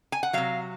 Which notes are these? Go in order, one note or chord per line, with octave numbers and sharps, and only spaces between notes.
G#5
F#5
C3 F#3 F5